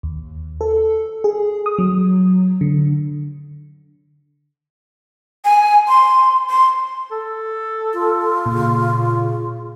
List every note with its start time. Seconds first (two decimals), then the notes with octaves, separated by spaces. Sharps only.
0.03 D#2
0.61 A4
1.24 G#4
1.66 D#6
1.78 F#3
2.61 D3
5.45 G#5
5.88 C6
6.50 C6
7.12 A4
7.94 F4
8.46 A#2 C#3